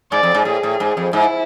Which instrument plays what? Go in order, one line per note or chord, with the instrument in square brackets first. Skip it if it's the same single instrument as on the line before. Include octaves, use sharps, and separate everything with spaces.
[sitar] G#2 [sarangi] D5
[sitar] F2
G#2
[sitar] A2 [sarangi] G#4
[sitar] A2
G#2
F2
[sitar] G#2 [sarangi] E4